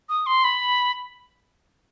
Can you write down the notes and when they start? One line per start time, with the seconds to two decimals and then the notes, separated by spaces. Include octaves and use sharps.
0.09 D#6
0.26 C6
0.44 B5